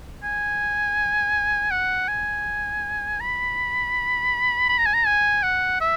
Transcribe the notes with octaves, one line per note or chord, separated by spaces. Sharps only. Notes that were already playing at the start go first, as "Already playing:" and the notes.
G#5
F#5
G#5
B5
B5
A#5
G#5
A#5
G#5
F#5
E5